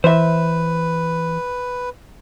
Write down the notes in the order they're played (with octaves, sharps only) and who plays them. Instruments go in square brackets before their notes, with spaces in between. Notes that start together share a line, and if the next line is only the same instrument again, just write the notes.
[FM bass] E3 [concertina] B4 [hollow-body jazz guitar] C5 E5